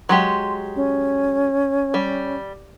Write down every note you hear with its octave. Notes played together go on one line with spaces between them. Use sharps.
F#3 G#3 G4 C6
C#4
G3